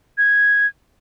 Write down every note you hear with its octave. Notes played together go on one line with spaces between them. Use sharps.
G#6